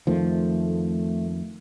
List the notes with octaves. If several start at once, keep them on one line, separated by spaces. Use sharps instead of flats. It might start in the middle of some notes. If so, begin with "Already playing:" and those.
F2 D#3 F3 A3